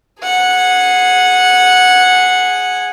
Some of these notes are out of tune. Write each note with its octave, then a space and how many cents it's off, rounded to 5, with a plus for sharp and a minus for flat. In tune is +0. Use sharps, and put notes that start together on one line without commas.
G#4 +0 F#5 -10